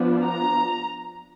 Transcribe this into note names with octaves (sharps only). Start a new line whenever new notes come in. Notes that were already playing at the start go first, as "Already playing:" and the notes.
Already playing: F3 B3 D4
A#5